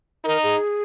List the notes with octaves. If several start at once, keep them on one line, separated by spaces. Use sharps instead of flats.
D#4 A#4
G#4